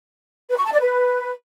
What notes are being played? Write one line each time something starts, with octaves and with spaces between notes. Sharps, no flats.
B4
C#6
A5
D5
B4